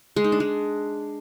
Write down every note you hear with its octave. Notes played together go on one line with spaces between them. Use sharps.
G#3
D#4
D4
G#3